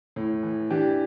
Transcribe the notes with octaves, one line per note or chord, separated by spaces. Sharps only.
A2
E3
E3 D4 G4